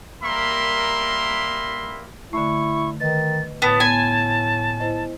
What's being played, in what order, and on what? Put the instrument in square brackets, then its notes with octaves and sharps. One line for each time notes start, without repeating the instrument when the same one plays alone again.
[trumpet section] G3 A#3 A#4 E5 B5 C6
[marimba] D3 A3 [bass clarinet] E4 [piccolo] C#6
[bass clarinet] D#3 [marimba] B4 D#5 [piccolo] A6
[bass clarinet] A2 [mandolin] B3 [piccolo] A5
[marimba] B3 [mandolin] G#5
[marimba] E4 C5 D#5